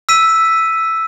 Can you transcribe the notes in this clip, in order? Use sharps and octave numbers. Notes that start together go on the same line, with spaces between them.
E6 B6 D#7